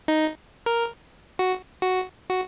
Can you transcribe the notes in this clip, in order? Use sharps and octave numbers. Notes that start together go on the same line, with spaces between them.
D#4
A#4
F#4
F#4
F#4